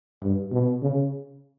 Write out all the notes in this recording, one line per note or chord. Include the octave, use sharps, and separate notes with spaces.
G2
B2
C#3